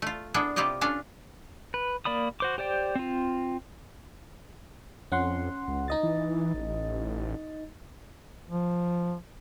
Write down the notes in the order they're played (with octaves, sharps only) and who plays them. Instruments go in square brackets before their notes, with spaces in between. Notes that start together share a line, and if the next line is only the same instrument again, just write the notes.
[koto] A3 F4
B3 D4 E4 G#4 A4
C3 E4 F4 G4 D5 D#5
C#4 D4 F4 A4 F5
[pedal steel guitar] B4
A#3 D5 B5 D#6
F#4 C5 D6
G4 C5 D5 G5
C4 F4
[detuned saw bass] F2 [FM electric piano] C#4 F#5 C6
[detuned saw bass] C#2
[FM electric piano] D#4 D#5 A6
[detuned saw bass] E3
A1
[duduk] F3